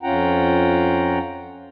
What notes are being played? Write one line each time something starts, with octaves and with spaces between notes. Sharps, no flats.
F2 C#4 F4 F#5 G5 A#5